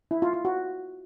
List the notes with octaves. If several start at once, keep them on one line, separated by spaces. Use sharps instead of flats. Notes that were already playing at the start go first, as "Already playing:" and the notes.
E4
F4
F4
F#4